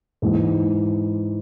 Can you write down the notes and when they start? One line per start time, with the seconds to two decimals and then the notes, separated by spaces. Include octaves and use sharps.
0.22 G#2 E3 G#3